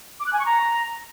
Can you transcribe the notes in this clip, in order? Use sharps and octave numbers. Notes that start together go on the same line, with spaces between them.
D6
F#6
G#5
C#6
A#5